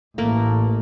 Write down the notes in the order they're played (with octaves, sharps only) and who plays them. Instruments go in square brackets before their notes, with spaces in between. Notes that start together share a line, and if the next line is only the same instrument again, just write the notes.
[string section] A1 [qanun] A3 A#3